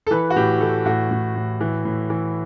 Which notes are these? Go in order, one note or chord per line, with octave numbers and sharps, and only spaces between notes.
A4
E3 B4
F#4
A2 G4
E3 A4
A2 F#4
A2
A2
E3
A2
E3